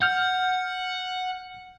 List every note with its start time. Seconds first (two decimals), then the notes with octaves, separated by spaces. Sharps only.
0.02 F#5 F6 G6